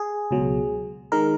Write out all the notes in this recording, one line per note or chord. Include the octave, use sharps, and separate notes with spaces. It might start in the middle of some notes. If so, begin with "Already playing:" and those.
Already playing: G#4
C#2 B2 F#3
D#3 G#3 D#4 A#4